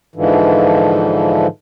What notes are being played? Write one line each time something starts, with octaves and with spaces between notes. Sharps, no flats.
G#2 D3 E3 F3